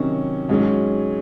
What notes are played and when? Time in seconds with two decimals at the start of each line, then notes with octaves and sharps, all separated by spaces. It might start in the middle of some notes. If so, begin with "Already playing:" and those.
Already playing: C3 D#3 F#3 C#4 F#4
0.49 G#2 F#3 C#4